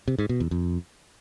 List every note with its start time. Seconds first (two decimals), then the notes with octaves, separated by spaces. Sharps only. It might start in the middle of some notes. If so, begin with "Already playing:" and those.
0.08 C3
0.18 G#2
0.29 B2
0.40 E2
0.51 F2